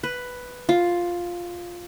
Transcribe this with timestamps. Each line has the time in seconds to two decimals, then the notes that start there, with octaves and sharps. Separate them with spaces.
0.03 B4
0.69 F4